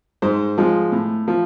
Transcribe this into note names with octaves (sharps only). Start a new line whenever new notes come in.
G#2 C5
F3 G#3
A2
F3